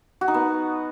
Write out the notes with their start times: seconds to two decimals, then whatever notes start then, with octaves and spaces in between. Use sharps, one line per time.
0.21 F#4
0.28 D#4
0.34 B3